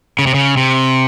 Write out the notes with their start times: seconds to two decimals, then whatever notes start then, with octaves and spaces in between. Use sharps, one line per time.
0.19 C#3
0.27 C3
0.34 C#3
0.57 C3